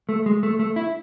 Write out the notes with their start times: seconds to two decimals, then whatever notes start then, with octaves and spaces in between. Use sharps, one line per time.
0.09 A3
0.26 G#3
0.43 A3
0.59 A3
0.76 E4